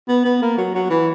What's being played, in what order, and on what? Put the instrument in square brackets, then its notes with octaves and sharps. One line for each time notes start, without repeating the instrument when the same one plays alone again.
[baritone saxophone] B3
B3
A#3
F#3
F#3
E3